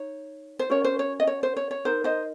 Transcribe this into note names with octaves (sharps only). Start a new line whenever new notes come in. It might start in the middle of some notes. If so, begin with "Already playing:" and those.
Already playing: D#4 C#5
C5
C#4 F#4 A#4 C#5
C5
C#5
D#5
C#5
C5
C#5
C#5
D#4 A#4 C5
C5 D#5